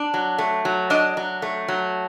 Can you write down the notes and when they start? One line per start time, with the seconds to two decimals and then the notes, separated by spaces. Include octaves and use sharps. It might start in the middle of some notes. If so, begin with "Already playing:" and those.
Already playing: D4
0.14 F#3
0.38 A3
0.65 F#3
0.90 D4 D#5
1.17 F#3
1.42 A3
1.68 F#3